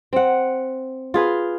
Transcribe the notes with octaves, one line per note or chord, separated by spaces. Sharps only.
C4 F#5
F4 G#4 B4